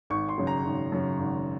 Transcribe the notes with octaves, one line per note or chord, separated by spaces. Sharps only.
G#1 C#6
C6
F#2 C#3
A#5
G#1
F#2 C#3
G#1